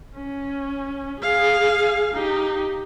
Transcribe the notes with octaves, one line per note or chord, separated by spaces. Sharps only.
C#4
G#4 F5
D#4 G4